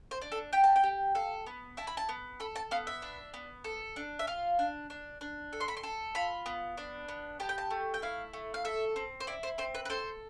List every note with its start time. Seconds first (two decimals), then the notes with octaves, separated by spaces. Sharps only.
0.11 C5
0.22 D4
0.32 A4
0.53 G4 G5
0.64 A5
0.76 G5
0.84 G4
1.15 A4 F5
1.46 B3
1.77 E4 A5
1.87 B5
1.97 A5
2.09 B3
2.40 A4 B5
2.56 A5
2.71 B3 F5
2.87 E5
3.02 D4
3.34 B3
3.64 A4
3.96 D4
4.19 E5
4.27 F4 F5
4.59 D4
4.90 D4
5.21 D4
5.53 A4
5.60 C6
5.68 B5
5.77 C6
5.83 A4
6.15 F4 B5
6.46 B3
6.77 D4
7.08 B3
7.40 G4 A5
7.49 G5
7.58 A5
7.71 A3
7.94 G5
8.02 E4 F5
8.33 A3
8.54 F5
8.65 A4 E5
8.96 C4
9.20 C5
9.27 E4 D5
9.43 C5
9.58 C4 C5
9.75 B4
9.85 B4
9.90 A4 C5